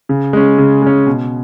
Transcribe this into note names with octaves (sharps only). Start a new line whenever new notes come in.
C#3
G#3 C#4
C#3
G#3 C#4
B2